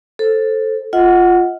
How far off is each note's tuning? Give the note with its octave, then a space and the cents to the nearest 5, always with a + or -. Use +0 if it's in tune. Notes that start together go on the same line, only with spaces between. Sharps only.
A4 +0 C5 +15
F4 +0 D#5 +40 F#5 +0